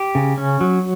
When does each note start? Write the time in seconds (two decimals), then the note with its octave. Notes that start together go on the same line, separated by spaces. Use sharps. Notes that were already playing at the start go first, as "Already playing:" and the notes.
Already playing: G4
0.15 C#3
0.38 C#4
0.61 F#3